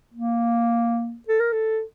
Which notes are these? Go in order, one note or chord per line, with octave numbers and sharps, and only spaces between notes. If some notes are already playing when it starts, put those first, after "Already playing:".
A#3
A4
A#4
A4